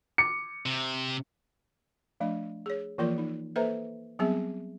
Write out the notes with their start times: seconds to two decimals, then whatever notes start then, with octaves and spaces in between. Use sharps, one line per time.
0.18 D6 C#7
0.66 C3
2.20 F3 A3 D4 D#5
2.66 G#4 C#5
2.98 E3 F3 A#3 F4 A#4 D5
3.18 D#4
3.56 A#3 A4 B4 C5 E5 A#5
4.19 F#3 G3 B3 C4 G#4 E5